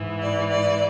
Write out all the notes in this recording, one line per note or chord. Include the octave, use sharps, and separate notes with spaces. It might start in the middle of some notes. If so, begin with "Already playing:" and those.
Already playing: G#2 E3
D5
D5